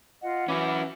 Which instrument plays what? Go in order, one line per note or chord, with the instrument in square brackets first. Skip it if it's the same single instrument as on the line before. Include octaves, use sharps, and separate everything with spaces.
[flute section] F4 D#5 F#5
[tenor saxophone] E3 [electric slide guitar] C#4 F#4 [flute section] B5 D6